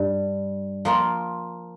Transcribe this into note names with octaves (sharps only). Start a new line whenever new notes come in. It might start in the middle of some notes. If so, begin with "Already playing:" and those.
Already playing: G2 G3
F3 A#3 F4